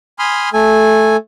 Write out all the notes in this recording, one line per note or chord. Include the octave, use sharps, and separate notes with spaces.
G#5 B5 C6 D#6 F6
A3 A4 G#5